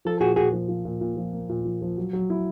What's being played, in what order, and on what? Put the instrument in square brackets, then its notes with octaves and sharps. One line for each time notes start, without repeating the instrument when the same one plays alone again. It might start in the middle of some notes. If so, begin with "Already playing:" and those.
[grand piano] F3 [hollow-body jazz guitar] A4
[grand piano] A#2 [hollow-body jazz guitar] F#4 G#4
[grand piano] A#2 [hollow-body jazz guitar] F#4 G#4
[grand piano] F3
F3
A#2
A#2
F3
A#3
A#2
F3
F3
F#3
F#3
E4